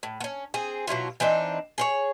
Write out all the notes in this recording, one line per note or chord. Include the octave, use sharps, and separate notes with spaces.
A2
B3 C#4
C4 G#4
B2 F#3 E4 F4
E3 C4 D4 D#4
G#4 C5 C#5